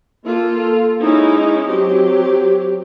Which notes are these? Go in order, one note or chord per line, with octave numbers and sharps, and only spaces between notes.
A#3 F4 A4
G#3 C#4 D#4 E4
F#3 C4 G4